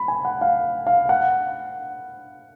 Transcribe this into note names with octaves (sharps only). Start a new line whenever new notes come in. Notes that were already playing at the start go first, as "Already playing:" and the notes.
Already playing: B5
G#5
F#5
F5
F5
F#5